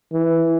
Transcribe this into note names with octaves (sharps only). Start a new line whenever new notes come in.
E3